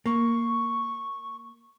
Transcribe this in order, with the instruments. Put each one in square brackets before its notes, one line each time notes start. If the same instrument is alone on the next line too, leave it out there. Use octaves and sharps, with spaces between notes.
[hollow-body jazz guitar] A#3 [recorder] C#6